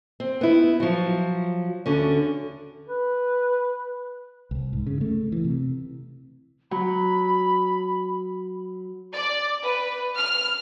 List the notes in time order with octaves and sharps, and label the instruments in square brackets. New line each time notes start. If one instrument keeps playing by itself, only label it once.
[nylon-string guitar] C4
B3 E4
F3 F#3
D2 D3 C#4
[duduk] B4
[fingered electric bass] C2
G#2
C#3
A3
E3
C3
[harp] F#3 [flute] B5
[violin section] D5
B4
F6